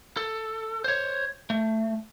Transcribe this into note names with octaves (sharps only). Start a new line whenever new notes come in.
A4
C5 C#5
A3